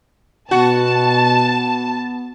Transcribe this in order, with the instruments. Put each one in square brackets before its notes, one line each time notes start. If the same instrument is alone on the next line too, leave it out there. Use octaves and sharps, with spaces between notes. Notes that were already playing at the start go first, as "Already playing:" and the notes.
[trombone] B2 [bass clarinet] B3 [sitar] F#4 [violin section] A5